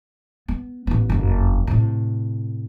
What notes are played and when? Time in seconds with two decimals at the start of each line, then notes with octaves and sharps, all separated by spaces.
0.48 B3
0.87 A1 B3
1.10 F#1 F2
1.67 A2 C3